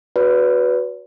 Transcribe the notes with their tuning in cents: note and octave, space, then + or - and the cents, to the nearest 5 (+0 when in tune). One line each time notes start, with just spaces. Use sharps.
F#4 +0 B4 +0 D5 -45